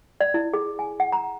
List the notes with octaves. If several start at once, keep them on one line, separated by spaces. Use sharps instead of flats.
D5
E4
G#4
G#5
F#5
A#5